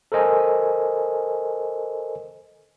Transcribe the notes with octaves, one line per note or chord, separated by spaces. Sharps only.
A4 A#4 C5 D#5 G#5